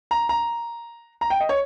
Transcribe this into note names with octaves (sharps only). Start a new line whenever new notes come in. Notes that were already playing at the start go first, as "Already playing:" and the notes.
A#5
A#5
A#5
G5
D#5
C#5